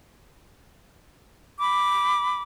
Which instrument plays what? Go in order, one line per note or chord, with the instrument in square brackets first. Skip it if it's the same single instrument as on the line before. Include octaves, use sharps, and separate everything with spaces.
[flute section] B5 D6